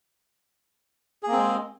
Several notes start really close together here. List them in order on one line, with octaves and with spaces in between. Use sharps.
G#4 A#3 C4 G#3